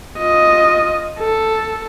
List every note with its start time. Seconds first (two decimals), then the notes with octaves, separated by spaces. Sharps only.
0.19 F4 D#5
1.19 A4